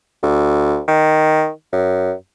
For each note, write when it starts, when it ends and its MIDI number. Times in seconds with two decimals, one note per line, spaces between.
0.23 0.80 38
0.88 1.49 51
1.72 2.12 42